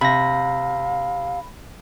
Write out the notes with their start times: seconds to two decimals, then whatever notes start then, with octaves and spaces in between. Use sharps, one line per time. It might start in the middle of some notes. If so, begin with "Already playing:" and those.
0.01 C3 F5 B5 A#6